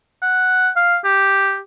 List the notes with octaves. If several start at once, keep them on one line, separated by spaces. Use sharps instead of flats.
F#5
F5
G4